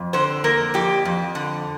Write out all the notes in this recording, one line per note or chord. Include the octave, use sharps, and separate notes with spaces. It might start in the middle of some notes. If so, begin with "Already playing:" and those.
Already playing: F2
D3 C5
A#3 A#4
F2 G4
F2
D3